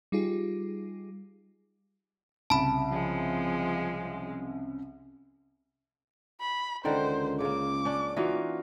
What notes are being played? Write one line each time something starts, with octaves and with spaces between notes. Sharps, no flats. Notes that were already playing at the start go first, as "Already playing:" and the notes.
G3 D#4 F4 G4 G#4
C2 C#3 A5 B5
F3 G#3
B5
C#2 D3 D#3 A#4 C5
C#3 A#3 D6
C#4 D4
E3 D#4 F4 F#4